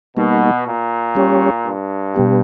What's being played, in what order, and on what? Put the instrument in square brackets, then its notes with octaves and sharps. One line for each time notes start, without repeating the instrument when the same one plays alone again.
[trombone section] B2 [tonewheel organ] G3 A#3 D#4
[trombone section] A#2
[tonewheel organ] G3 C#4 G4 C#5
[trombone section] G2
[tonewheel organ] B2 G3 B3 G4